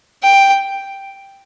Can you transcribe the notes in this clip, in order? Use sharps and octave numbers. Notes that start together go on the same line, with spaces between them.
G5